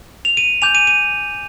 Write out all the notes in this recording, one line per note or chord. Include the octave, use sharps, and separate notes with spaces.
F7
D#7
G#5 D6 G6 F7
D#7
D#7